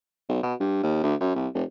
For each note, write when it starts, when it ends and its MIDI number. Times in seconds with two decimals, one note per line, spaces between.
0.29 0.40 35
0.43 0.54 47
0.60 0.79 43
0.83 1.00 39
1.03 1.14 38
1.21 1.35 42
1.35 1.47 36
1.54 1.63 29